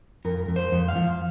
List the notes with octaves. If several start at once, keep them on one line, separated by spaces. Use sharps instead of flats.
F2 A#4
F2
C5
F2
F5
F3